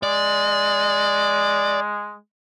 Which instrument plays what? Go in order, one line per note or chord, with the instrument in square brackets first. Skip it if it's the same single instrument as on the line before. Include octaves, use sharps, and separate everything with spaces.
[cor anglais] G#3 [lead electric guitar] D5